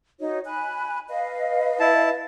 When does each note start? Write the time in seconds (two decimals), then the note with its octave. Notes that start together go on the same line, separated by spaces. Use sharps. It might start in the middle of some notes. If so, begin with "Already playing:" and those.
0.20 D#4 F#4 C#5
0.46 G#5 B5 F#6
1.09 B4 D#5 F5
1.80 E4 A5